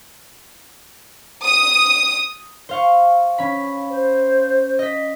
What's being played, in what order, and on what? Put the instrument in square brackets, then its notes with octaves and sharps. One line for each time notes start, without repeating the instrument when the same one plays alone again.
[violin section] D#6
[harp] C5 F5 C#6
C#4 B5
[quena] C5
[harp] D#5 B6